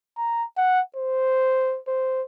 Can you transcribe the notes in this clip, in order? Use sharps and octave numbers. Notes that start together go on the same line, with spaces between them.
A#5
F#5
C5
C5